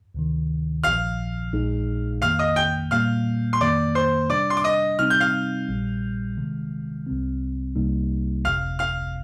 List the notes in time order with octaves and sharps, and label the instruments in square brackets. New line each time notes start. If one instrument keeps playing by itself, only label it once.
[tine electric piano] D2 C3 D#3
[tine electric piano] A#1 A#2 F3 [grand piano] F5 F6
[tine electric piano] A#1 A#2 G#3 D#4 G#4
[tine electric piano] F2 D#3 A#3 [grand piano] F5 F6
[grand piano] D#5 D#6
G5 G6
[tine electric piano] A#2 G3 A#3 [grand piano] F5 F6
[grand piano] C6
[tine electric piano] F2 D#3 A#3 [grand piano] D5 D6
[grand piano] C5 C6
[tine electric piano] C3 G3 D4 [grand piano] D5 D6
[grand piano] C6
D6
D#5 D#6
[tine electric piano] C3 G3 C4 D#4 [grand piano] F6
[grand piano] G6
F5 F6
[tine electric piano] A#1 A#2 G3
C3 D#3 G#3
C2 C3 G3 C4
C2 C3 G3 A#3 D#4
[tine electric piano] G1 F2 C3 [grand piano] F5 F6
[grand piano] F5 F6